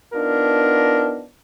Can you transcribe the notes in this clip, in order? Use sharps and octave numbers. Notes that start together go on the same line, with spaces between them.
B3 D4 D#4 F4 A#4